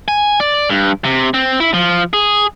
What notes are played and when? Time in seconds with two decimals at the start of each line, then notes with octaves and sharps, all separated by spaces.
0.08 G#5
0.40 D5
0.70 G2
1.05 C3
1.34 C4
1.60 E4
1.74 F3
2.13 G#4